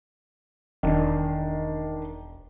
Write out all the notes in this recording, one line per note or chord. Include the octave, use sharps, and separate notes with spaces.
E1 D#3 D4